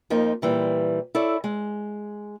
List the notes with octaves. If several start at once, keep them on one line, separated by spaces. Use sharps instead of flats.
F2 F3 A#3 D#4
A#2 E3 G3
E4 A4 C#5 D5
G#3